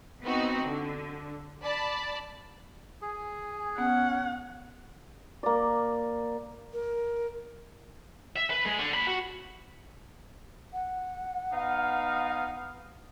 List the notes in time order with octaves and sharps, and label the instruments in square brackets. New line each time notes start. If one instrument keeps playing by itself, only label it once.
[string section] B3 C4 D#4 F#4
D3
D5 A5 B5
[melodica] G#4 [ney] G#5
[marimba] B3 [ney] C#4 [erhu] F#5
[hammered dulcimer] A#3 D5
[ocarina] A#4
[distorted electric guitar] E5
B4
G#3
D3
A#2 B5
F#4
[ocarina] F#5
[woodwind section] B3 D#4 F5